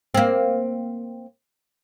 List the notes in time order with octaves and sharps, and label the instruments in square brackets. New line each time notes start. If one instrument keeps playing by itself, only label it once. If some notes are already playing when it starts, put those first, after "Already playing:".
[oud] A#3 C4